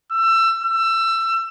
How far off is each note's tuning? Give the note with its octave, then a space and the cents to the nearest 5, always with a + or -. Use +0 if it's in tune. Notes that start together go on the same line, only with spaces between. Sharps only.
E6 +25
E6 +25